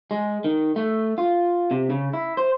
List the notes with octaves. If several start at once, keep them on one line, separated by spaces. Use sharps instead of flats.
G#3
D#3
A3
F4
C3
C#3
E4
C5